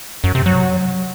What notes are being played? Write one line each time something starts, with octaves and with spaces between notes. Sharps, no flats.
F#2
C3
F#3